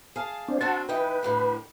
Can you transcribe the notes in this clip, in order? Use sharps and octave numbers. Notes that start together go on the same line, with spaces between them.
G#4 F5 A5
C4 D4
C4 D4 F#4 F#5 A5
E3 D#4 B4 G5
A2 D3 G3